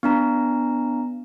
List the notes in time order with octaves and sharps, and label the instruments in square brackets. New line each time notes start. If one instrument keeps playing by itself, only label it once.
[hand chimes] B3 D4 A#5